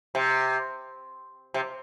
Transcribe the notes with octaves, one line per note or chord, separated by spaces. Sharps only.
C3
C3